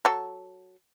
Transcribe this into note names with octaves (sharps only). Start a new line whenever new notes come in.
F#3 A4